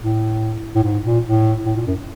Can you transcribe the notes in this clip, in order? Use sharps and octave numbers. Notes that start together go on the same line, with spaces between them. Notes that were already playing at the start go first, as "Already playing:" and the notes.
A2
A2
G#2
A#2
A2
A2
A#2
F#2